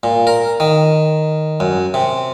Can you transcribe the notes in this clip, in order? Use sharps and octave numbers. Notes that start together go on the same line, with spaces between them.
A#2
A#4
D#3
F#2
C3